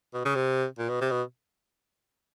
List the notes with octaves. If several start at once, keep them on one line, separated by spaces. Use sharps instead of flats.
B2
C#3
C3
A#2
B2
C3
B2